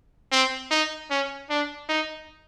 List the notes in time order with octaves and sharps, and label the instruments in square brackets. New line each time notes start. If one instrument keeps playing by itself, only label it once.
[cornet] C4
D#4
C#4
D4
D#4